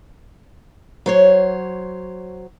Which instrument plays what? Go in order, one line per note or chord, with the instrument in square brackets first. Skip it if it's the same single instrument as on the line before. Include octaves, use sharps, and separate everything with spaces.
[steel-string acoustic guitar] F#3 C5 C#5